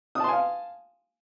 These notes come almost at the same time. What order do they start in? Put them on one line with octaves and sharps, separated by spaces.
D#6 A5 C6 G#5 F5